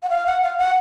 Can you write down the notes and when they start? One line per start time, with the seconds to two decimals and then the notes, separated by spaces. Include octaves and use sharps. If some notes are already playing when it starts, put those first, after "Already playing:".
0.03 F#5
0.10 F5
0.26 F#5
0.42 F5
0.58 F#5